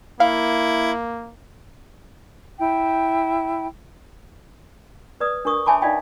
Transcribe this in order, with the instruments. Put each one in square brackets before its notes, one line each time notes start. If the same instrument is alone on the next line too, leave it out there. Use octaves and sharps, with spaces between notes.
[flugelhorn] A#3 [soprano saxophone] E4 [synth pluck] F5
[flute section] E4 G5
[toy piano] B4 D5 D#6
D4 A#4 C#6 D#6
C#5 E5 G#5 A5 B5 D6
D#4 D5 D#5 F5 G5 B5